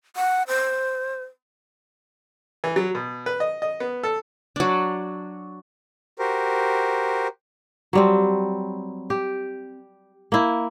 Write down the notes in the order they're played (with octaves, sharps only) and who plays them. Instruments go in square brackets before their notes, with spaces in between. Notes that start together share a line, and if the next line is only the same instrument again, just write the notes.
[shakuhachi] F#5
C5
[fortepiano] E3
F#3
B2
B4
D#5
D#5
B3
A4
[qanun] F#3 D4
[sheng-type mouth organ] F#4 G4 A#4 C5
[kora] F#3 G3 C4
G4
A#3 E4